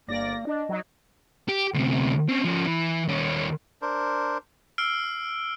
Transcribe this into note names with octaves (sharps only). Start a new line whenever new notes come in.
G1 A#3 D5 A#6
D4 D#5
F#3 D#4
G4
D2 C3
C4 C#4
F3 C#4
E3
D#2 C#4
D4 A#4 C5
E6 F6 C7 D7